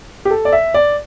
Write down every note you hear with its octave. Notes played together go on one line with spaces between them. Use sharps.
G4
A4
D5
E5
D5